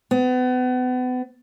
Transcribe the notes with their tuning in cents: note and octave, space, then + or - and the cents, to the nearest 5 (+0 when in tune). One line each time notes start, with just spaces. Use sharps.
B3 +35